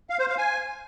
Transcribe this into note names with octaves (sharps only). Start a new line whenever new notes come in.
F5
C5
F5
G#5